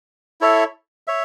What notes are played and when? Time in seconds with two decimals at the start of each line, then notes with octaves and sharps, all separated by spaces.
0.41 E4 A4 C#5 E5
1.07 C#5 E5